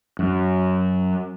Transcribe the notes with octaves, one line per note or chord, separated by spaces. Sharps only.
F#2